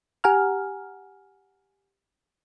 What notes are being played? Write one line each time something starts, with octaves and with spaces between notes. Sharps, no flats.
G4 F#5 G#5 A#5 F6